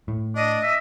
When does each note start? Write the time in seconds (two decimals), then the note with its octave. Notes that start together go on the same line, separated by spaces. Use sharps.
0.08 A2
0.35 D4 D#5
0.63 E5